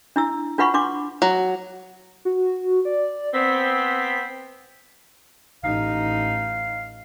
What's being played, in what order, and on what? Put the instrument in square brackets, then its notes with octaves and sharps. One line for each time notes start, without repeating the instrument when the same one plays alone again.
[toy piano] D4 E4 E6
D4 F4 B4 F#5 B5 C#6
D4 C6 D6
[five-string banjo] F#3
[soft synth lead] F#4
D5
[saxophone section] B3 C4 [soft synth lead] B6
[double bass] A1 D#4 [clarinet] F5